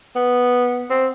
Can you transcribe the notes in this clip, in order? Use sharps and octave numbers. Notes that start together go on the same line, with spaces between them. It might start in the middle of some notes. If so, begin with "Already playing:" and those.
B3
C4